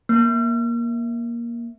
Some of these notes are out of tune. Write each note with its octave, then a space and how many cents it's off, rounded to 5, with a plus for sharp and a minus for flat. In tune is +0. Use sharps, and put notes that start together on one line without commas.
A#3 +15